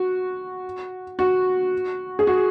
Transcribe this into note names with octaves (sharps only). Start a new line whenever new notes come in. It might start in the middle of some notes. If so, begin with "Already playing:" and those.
Already playing: F#4
F#4
G#4
F#4